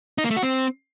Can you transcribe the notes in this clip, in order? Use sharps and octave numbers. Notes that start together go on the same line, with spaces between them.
D#4
A#3
A3
F#4
C4